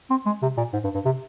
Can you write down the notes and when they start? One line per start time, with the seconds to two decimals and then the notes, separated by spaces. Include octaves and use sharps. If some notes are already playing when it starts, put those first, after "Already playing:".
0.10 C4
0.26 G#3
0.42 C3
0.58 A#2
0.73 G#2
0.84 G2
0.95 G2
1.05 C3